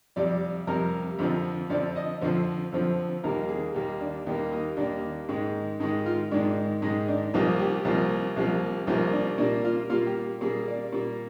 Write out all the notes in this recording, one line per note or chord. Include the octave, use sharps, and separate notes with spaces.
F2 C3 G3 D5
F2 C3 G3 A#4
F2 D3 F3 C4
F2 D3 F3 C4 D5
D#5
F2 D3 F3 C4 C5
F2 D3 F3 C4
D#2 D#3 G3 A#3 A#4
G#4
D#2 D#3 G3 A#3 G4
D4
D#2 D#3 G3 A#3 G4
D#4
D#2 D#3 G3 A#3 D4
G#2 D#3 G#3
G#2 D#3 G#3 D#4
F4
G#2 D#3 G#3 D4
G#2 D#3 G#3 D#4
D4
C2 C3 F3 A#3 D#4
G4
C2 C3 F3 A#3
C2 C3 F3 A#3
C2 C3 F3 A#3 D#4
D4
A#2 G3 A#3 D4
F4
A#2 G3 A#3 F4
G4
A#2 G3 A#3 G#4
D5
A#2 G3 A#3